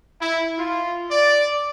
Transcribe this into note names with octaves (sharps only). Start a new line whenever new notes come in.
E4
F4
D5